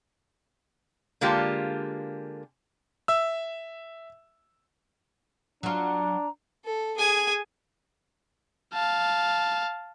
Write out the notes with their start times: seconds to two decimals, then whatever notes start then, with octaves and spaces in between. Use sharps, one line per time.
1.21 D3 G#3 A#3 F4 G4
3.08 E5 E6
5.63 F#3 D4 F4 A#5
6.65 A4
6.97 G#4 G#5
8.74 F5 A5